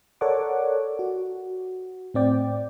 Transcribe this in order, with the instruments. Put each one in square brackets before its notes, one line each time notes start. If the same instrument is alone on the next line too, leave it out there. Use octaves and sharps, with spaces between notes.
[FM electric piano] A4 A#4 C#5 D5 F#5 D6
F#4
A2 C4 D5 G5